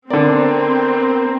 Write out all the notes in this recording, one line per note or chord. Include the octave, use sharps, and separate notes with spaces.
D3 B3 C4 A#4 D5